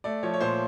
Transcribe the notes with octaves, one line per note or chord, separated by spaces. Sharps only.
A3 D5
F3 C#5
C#5
A#2 C5